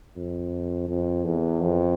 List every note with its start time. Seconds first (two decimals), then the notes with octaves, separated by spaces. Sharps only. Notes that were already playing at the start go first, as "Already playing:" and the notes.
0.16 F2
0.88 F2
1.25 E2
1.61 F2